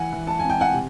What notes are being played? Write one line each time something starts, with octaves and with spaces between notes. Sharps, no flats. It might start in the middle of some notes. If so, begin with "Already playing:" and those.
Already playing: E3 F#5 G#5
E3
A5
C4 G#5
G5
F#5 G#5
C3